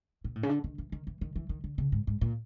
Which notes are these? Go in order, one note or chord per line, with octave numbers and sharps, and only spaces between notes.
A#2
A2
C#3
D3
D#3
E3
D#3
E3
D#3
E3
D#3
D3
C#3
G#2
G#2
A#2